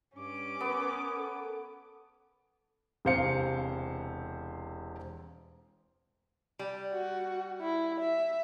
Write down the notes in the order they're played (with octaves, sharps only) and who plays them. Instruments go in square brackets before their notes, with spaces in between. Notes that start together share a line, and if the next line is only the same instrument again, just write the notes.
[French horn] G2 [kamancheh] C#4 D6
[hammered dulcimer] B3 [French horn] A#4
[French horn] A4
[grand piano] E1 C3 C5 F5 C#7
[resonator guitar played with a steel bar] G3
[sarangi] F#4
E4
E5